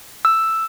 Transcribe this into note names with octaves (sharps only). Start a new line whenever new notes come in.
E6